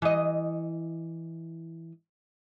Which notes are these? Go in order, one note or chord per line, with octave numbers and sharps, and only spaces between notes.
E3 D#5